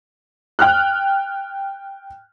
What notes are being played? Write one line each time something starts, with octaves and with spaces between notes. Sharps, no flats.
G5 F6 F#6